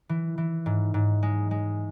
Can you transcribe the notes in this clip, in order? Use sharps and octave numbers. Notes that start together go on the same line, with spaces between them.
E3
E3
G#2
G#2
G#3
G#3